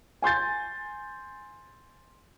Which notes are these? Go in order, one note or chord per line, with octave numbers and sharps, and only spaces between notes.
G#5 C6 G6 A6